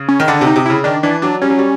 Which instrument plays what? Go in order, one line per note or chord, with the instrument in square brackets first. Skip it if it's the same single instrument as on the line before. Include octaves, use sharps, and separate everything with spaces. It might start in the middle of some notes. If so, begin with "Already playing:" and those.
Already playing: [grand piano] C#3
[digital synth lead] C#4
[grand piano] D#3
[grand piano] D3 [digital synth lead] D4
[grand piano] C3
[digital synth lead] D#4
[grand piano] C3
[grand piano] C#3 [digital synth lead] E4
[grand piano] D#3 [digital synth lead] D4
[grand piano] E3 [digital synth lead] D4
[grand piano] F#3 [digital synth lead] D4
[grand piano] G3 [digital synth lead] C#4
[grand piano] F#3
G3